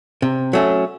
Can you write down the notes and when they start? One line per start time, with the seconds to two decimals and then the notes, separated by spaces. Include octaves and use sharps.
0.22 C3
0.53 F#3 A3 C#4